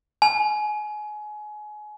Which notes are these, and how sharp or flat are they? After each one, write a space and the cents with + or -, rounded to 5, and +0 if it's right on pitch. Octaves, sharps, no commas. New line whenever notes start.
G#5 +25